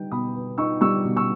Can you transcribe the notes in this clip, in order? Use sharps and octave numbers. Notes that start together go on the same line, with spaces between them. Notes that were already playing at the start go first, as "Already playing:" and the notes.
Already playing: G3 B3 D#4 G5
B2 B5 D#6
B3
D#4 C#6 E6
G3 C#6 E6
B2
C#6 E6